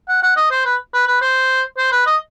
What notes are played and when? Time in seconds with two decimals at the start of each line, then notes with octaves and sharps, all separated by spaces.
0.09 F#5
0.23 F#5
0.37 D#5
0.51 C5
0.66 B4
0.94 B4
1.08 B4
1.22 C5
1.78 C5
1.92 B4
2.07 D#5